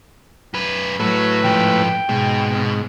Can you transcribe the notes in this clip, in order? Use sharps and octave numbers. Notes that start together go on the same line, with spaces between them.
F#2 B4
A2 F#3 B4
G#2 F3 G5
G#2 B2